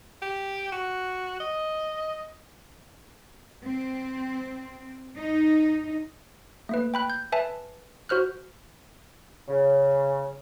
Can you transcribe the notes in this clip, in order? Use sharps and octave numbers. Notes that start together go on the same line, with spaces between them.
G4
F#4
D#5
C4
D#4
A3 A#3 B4
G5 B5 F#6
G6
B4 E5 G#5 A5
F#4 C5 F6 F#6
C#3